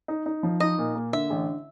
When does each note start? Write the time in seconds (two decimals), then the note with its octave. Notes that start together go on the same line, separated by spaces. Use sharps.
0.08 D#4
0.26 D#4
0.43 F3
0.60 D#4 D#5
0.78 A#2
0.95 A#3
1.13 D3 E5
1.30 A1